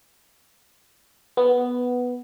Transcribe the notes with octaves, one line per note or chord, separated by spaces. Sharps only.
B3